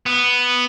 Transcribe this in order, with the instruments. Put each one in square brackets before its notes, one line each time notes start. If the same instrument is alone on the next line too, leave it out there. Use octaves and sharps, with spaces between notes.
[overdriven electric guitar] B3